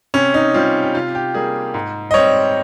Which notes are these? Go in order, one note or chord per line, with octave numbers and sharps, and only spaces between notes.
C3 C#4
D#4
G3 C4 F4
G4
C3 F4
G4
G3 A#3 G#4
G#2
D#5
G3 C4 C#5